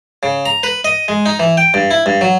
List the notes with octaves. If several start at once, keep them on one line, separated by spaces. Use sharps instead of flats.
C#3
A#5
B4
D#5
G#3
D#4
E3
G5
G2
E4
G2
F#3